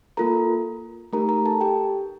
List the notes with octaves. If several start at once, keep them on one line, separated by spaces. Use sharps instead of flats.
A#3 F4 A4 A#4 A#5
A3 D#4 G4 A#4 A#5
A#4 A#5
A4 A5
G4 G5